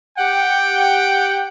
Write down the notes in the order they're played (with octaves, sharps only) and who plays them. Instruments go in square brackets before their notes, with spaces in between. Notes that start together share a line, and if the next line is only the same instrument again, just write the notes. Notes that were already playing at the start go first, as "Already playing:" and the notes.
[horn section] G4 F#5 G5